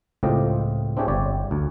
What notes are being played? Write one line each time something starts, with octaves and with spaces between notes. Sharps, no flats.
C#2 A2 C4 F4 G4 D#5
C4 D4 E4 G4 G#4 C#5
G1 G4 C#5 D5
D2